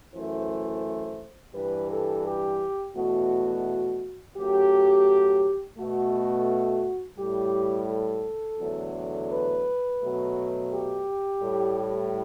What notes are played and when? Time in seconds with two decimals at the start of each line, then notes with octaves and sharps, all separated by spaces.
0.14 F#2 E3 A3 C5
1.55 G2 E3 G3 B4
1.90 A4
2.25 G4
2.96 E2 B2 A3 F#4
4.37 F#2 F#3 A3 G4
5.77 B2 A3 F#4
7.18 A2 G3 G4
7.89 A4
8.59 E2 D3 F#3 A3
9.30 B4
10.00 B2 F#3 A3
10.71 G4
11.42 A2 G3